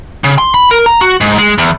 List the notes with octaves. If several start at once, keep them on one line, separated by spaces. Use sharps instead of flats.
C#3
C6
B5
A#4
A#5
F#4
G#2
G#3
E2